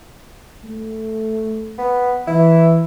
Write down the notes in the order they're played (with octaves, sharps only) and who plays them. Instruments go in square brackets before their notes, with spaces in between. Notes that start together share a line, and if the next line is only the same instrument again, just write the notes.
[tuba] A3
[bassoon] B3
[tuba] E3 [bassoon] E4